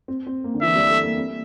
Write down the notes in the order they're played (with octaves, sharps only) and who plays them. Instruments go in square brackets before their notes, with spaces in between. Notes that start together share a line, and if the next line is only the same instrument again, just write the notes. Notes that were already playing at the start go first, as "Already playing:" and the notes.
[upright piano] C4
C4
A#3
D3
[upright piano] E3 [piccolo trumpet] E5
[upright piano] G3
A3
A#3
C4